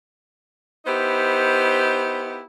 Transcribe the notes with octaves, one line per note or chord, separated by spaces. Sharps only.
B3 D#4 E4 G4 C5